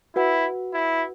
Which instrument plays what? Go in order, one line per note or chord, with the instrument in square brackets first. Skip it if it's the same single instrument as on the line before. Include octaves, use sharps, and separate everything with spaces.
[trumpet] E4 [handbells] F#4 B4 F#5
[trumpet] E4